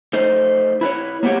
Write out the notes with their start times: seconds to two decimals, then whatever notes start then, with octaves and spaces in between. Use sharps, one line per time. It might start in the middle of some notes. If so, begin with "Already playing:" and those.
0.13 A3 D#4 C5
0.81 E4 B4 C#5
1.23 A#3 B3 F#4 G4 C#5